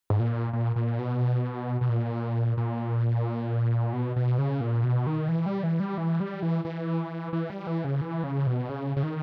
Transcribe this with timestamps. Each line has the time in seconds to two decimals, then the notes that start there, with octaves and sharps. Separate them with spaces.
0.10 G#2
0.20 A#2
0.53 A#2
0.76 A#2
0.99 B2
1.81 B2
1.89 A#2
2.57 A#2
3.93 B2
4.16 B2
4.38 C#3
4.61 A#2
4.84 B2
5.07 D#3
5.29 E3
5.46 G3
5.63 E3
5.80 G3
5.98 E3
6.20 G3
6.42 E3
6.65 E3
7.33 E3
7.50 G3
7.67 E3
7.84 C#3
8.01 E3
8.24 C#3
8.47 B2
8.69 C#3
8.96 C#3
9.03 D#3